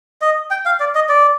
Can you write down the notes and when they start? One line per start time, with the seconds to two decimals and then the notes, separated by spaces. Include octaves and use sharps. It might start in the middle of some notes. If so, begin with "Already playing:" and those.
0.21 D#5
0.51 G5
0.65 F5
0.80 D5
0.95 D#5
1.09 D5